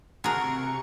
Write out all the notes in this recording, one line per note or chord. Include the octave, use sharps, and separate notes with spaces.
C3 A3 F4 F#4 G#4 A#4 C#6 C#7